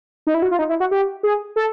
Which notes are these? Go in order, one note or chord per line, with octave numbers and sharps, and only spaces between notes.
D#4
E4
F#4
F4
D#4
E4
F#4
G4
G#4
A4